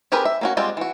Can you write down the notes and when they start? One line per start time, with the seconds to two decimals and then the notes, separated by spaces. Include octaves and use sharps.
0.12 C4 G4 G#4 A#4 B4
0.25 E5
0.41 A#3 C#4 F#4
0.57 G3 G#3 C4 F4 D5
0.77 E3 F#4